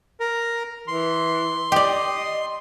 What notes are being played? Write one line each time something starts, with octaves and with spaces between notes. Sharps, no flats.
A#4
E3 C6
G4 D5 D#5